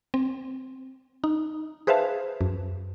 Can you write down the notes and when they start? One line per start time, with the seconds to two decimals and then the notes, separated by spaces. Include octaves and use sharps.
0.14 C4
1.24 D#4
1.87 G#4 B4 C5 E5 F5 A5
2.41 F#2